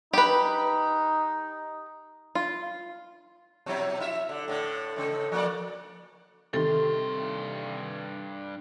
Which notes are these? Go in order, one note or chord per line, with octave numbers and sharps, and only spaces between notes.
D#4 G4 B4
F4
B2 F#3 E4
E4 E5
D3
A2 D3
A2 C#3
F3 A#3 D5
G2 C3 D#3 A4 C6